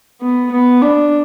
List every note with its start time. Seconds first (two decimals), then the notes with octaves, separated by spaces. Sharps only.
0.22 B3
0.51 B3
0.82 D4